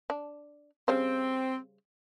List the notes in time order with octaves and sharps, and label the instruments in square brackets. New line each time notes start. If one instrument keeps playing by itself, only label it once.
[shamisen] D4
[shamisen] C#3 G3 C5 [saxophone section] C4